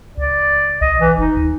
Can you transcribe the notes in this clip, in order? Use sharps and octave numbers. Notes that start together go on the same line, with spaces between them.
C#2 D5
B1 D#5
E3
F1 D#4
D#2